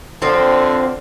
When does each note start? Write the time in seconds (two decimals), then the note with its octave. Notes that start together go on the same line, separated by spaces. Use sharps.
0.22 D3 F3 C4